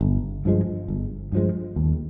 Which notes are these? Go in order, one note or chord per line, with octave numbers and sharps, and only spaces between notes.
G1
G2 F3 G#3
G1
G2 F3 G#3
D#2